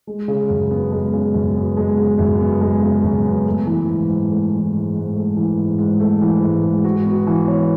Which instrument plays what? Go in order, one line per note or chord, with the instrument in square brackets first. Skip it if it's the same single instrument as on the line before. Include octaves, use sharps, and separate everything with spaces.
[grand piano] G#3
C#3
F#2
B3
G#3
C#3
F#2
B3
G#3
C#3
F#2
B3
G#3
C#3
F#2
B3
A3
E3
G#2
G#2
A3
E3
G#2
G#2
A3
E3
G#2
G#2
A3
E3
G#2
G#2
F#4
B3
E3
C#5